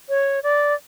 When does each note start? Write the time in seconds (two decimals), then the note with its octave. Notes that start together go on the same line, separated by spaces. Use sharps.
0.09 C#5
0.43 D5